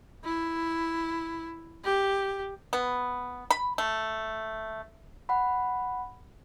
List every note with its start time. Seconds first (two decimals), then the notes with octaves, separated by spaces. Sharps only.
0.24 E4
1.84 G4
2.73 B3
3.51 B5
3.78 A3
5.29 F#5 B5